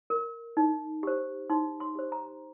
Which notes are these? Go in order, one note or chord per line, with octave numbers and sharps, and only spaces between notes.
A#4
D#4
G4 C5
D#4 C6
C6
G4 C5
A#5